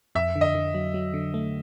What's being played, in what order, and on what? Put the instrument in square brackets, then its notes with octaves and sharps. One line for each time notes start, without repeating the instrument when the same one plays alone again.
[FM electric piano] F2 [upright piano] E5
[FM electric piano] D3
[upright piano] D#5
[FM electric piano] D3
F#3
F#3
D3
A3